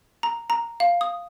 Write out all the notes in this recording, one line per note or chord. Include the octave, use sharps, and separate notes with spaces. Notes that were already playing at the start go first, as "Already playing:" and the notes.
A#5
A#5
F5
D#6